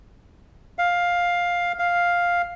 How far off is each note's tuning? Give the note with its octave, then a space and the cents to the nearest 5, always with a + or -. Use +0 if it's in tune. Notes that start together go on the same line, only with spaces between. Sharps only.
F5 +10
F5 +5